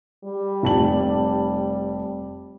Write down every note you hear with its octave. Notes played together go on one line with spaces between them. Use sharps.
G3
F1 A5 F#7